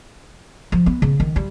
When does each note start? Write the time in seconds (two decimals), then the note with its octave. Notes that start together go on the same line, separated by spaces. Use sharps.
0.72 F3
0.86 B3
1.02 C#3
1.20 D#3
1.36 G3